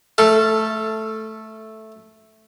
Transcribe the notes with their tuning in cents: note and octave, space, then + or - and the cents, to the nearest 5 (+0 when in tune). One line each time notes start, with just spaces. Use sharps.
A3 -5 A4 +0 F5 -30